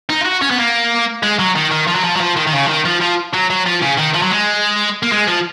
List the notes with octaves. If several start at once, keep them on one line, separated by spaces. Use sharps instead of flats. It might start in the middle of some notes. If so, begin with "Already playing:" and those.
D#4
F4
F#4
C#4
B3
A#3
G#3
F#3
D#3
D#3
F3
F#3
F3
F#3
F3
D#3
D#3
C#3
F3
D#3
F3
F3
F#3
F#3
F3
C#3
D#3
F3
F#3
G#3
A#3
G#3
F3